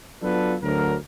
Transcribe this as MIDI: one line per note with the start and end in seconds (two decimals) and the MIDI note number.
0.23 0.55 54
0.23 0.55 59
0.23 0.55 62
0.23 0.55 65
0.23 0.55 69
0.23 0.55 71
0.62 0.95 38
0.62 0.95 54
0.62 0.95 70